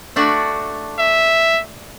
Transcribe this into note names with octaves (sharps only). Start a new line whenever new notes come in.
A3 D4 F#4
E5